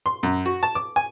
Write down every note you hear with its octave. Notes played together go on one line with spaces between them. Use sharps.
C6
F#2
F#4
A5
D6
G#5